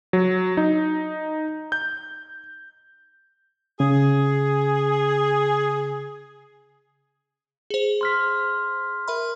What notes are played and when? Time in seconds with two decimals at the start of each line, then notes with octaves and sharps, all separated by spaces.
0.13 F#3
0.57 D#4
1.72 G6
3.80 C#3 G#4
7.70 G#4 C5
8.01 C6 F6 B6
9.08 A#4 E5 B5